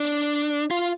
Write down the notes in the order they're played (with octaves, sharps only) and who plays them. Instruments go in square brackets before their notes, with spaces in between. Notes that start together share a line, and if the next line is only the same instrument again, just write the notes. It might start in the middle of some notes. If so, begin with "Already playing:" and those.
Already playing: [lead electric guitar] D4
F4